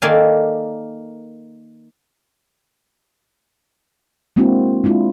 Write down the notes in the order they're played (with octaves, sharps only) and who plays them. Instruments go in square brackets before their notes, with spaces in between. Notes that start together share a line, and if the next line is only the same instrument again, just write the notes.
[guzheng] D#3 A#3 A4 D5 F5 G#5
[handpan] G#3 A#3 C4 D4 E4 F#4
G#3 D4 E4 F4